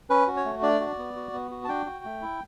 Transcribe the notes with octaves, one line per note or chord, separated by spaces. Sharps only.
C#4 B4
F#4
C#5
A3
D4 D5
F#4
B3
F#4
B3
F#4
A5
D4 G5
F#4
A3
E4